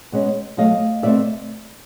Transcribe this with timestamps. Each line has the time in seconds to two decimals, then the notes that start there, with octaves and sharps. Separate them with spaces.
0.12 B2 G#3 C#4
0.57 B2 F#3 A3 D#5 F5
1.02 B2 F#3 A3 C4 D5 E5